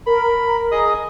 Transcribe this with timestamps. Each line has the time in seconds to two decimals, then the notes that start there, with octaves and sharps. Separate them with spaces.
0.06 A#4 B5
0.72 G#4 D#5 D#6